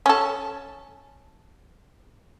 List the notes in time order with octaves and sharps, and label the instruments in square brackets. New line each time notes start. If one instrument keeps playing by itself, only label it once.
[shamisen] C#4 A4